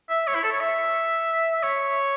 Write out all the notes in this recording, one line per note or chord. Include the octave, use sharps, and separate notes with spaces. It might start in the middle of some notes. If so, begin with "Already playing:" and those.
E5
C#5
E4
A4
C#5
E5
E5
C#5